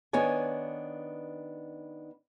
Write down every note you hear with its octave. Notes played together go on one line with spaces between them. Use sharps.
D#3 B3 D4 C#5 G#5